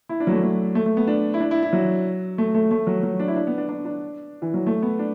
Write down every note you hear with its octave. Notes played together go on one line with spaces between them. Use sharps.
E4
D4
F#3
A3
F#3
A3
A3
B3
D4
E4
D4
E4
E4
F#3
A3
A3
A3
F#3
F#3
D4
E4
D4
B3
D4
D4
D4
E3
F#3
A3
B3
D4